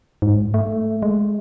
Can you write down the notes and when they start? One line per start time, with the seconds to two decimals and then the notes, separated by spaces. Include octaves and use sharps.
0.22 G#2
0.54 A3
1.02 G#3